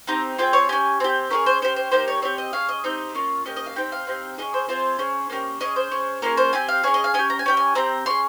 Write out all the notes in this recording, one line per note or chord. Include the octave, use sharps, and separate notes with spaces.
C4 D#4 G4 A#5
C4 F4 G#4 G5
C#5
C#4 G4 G#5
C4 G4
C#4 F4 G#4 A#4
C5
C#4 G4 C5
C5
A#3 D#4 G4 C5
C#5
C4 G4 C#5
D#5
C#4 G#4 F5
D#5
C4 D#4 G4
A#3 C#4 F4
A#3 C#4 G4 D#5
D#5
F5
C4 D#4 G4 G5
F5
C4 D#4 G4
C#4 F4 G#4 D#5
C5
C4 F4 G#4 C5
C#4 G#4
A#3 C#4 G4
C#4 G#4 D#5
C5
C#4 G#4
A#3 C#4 F4 G#4 A#4
C5
C4 G4 G#5
F5
C#4 G#4 C#5
D#5
F5
C#4 G4 G#5
A#5
G#5
C#4 G4 G5
G#5
C4 G4 A#5
C#4 G#4 C6